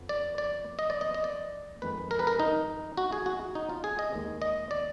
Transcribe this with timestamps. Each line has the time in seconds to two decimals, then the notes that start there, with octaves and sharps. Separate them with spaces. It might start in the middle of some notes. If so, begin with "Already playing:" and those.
Already playing: F2 F3 B3
0.09 D5
0.38 D5
0.79 D#5
0.90 D5
1.01 D#5
1.14 D#5
1.24 D5
1.82 F2 D#3 G#3 B4
2.11 A#4
2.19 B4
2.27 A#4
2.40 D#4
2.97 F#4
3.12 G#4
3.26 F#4
3.55 D#4
3.69 F4
3.84 G#4
3.99 D#5
4.13 D#2 D#3 G#3
4.42 D#5
4.71 D5